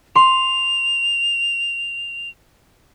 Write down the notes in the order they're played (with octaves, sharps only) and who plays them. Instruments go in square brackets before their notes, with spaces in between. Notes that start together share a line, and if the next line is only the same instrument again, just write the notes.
[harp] C6 [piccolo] F7